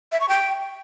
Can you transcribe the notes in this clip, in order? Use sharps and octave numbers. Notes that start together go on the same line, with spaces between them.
E5
C#6
G5